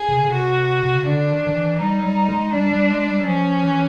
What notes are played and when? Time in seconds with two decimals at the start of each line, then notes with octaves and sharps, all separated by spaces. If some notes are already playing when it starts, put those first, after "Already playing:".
Already playing: G#4
0.09 C3
0.17 C#3
0.25 C3
0.34 F#4
0.83 C3
0.95 C#3
1.06 D3 D4
1.31 D#3
1.47 D#3
1.55 E3
1.80 G3 D#4
1.99 F#3
2.05 G3
2.29 G#3
2.53 G3 D4
2.71 G3
2.90 G#3
3.08 G3
3.20 F#3
3.26 F3 C#4
3.63 E3